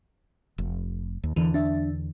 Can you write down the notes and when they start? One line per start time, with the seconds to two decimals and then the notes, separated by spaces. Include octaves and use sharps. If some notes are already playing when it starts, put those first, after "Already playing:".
0.58 F1
1.24 D#2
1.36 E2 D3 E3
1.54 D4 E5